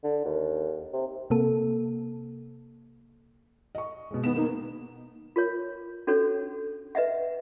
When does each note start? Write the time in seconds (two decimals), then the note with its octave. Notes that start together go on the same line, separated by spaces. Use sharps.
0.04 D3
0.25 D#2
0.93 C3
1.30 C3 A#3 A4
3.75 D#5 C#6
4.11 B2 G#3
4.24 D#3 B3 E7
4.36 A#3 D#4
5.36 F4 A#4 C#5
6.07 C#4 D4 F#4 A4 C#5
6.95 B4 D#5 E5 F#5